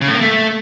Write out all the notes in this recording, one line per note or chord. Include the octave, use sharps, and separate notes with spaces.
C#3
A2
A#3
A3